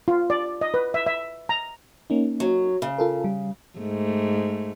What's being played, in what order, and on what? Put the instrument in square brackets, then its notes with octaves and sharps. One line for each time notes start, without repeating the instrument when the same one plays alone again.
[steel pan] F4
D5
D#5
B4
E5
E5
A#5
[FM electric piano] A#3 C#4 D#4
[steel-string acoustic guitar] F#3
C#3
[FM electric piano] F4 A4 A#4
G3
[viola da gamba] G#2 A3